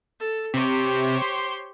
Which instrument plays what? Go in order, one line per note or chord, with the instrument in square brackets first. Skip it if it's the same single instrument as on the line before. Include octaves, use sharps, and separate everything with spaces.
[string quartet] A4
[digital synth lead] C3 [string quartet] G4 C5 C#5
[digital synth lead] C6